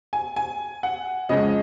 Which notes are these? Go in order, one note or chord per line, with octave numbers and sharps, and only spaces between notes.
G#5
G#5
F#5
F2 C#3 G#3 D#5